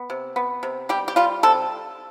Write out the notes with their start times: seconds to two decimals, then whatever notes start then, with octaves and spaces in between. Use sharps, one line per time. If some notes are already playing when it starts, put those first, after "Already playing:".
Already playing: B3
0.10 C3
0.36 B3
0.63 C3
0.89 G3 G4
1.08 G4
1.16 G3 F4
1.43 C3 A4